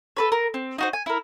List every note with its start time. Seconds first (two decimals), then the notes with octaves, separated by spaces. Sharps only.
0.17 A4 B4 C#5
0.32 A#4
0.54 C4
0.78 D#4 F#4 C5
0.93 G#5
1.06 E4 A#4